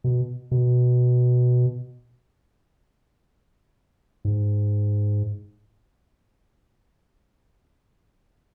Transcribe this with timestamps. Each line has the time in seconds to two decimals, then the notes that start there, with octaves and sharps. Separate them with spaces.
0.04 B2
0.51 B2
4.25 G#2